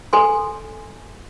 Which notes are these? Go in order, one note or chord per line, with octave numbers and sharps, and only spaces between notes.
A4 G#5 C6